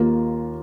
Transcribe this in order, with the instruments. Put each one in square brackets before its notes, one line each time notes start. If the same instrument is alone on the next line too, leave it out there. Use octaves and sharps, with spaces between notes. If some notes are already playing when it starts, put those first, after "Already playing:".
Already playing: [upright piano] D#2 D#3 A#3 F4